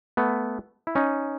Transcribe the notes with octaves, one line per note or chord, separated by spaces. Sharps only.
A3 B3
E4
C#4 D#4